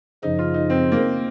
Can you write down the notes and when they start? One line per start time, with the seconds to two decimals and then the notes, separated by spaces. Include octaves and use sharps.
0.23 F#2 C#3 F3 D#4
0.39 F4
0.54 D#4
0.70 C4
0.92 A#3